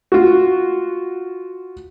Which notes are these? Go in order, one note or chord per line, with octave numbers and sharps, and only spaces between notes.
F4 F#4